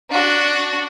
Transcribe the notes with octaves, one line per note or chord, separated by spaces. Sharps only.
D4 F#4